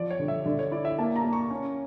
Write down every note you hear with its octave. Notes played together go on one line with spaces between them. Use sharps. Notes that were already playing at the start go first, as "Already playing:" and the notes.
Already playing: F3 D5
C#5
D3
E5
D3 D5
C#5
E4 D5
E5
A#3 A5
A#5
A#3
C#6
C#4